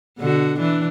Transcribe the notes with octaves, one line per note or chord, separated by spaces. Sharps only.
B2 D3 F#4
E3 D4